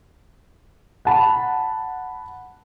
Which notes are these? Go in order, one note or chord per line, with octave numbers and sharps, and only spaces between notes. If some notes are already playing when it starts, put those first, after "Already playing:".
F#5 A5 B5